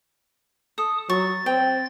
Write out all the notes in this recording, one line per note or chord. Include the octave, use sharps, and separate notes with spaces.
A4 D#6
F#3 C#6 A6
C4 G5